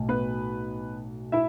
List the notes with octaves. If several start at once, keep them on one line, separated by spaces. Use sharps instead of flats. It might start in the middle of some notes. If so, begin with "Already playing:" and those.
Already playing: B1 A2
B3 B4
E4 E5